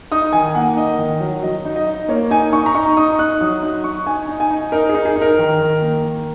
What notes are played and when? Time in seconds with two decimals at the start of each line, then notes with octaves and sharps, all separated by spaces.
0.12 D#4 D#6
0.33 D#3 G#5
0.55 A#3 F#5
0.77 D#4 D#5
0.98 D#3
1.20 F#3
1.43 F#3 D#5
1.65 D#4
1.76 D#5
1.87 D#4
2.09 A#3 C#5
2.30 D#4 G#5
2.53 D#4 C#6
2.66 A#5
2.75 D#4 C#6
2.97 D#4 D#6
3.19 D#4 F#6
3.41 F#3 D#6
3.62 D#4 D#6
3.84 D#4 C#6
4.06 D#4 G#5
4.28 D#4
4.40 G#5
4.51 D#4
4.72 D#4 A#4
4.89 G#4
4.95 D#4
5.05 G#4
5.16 D#4
5.22 A#4
5.39 D#3
5.61 D#3
5.82 A#3
6.04 D#3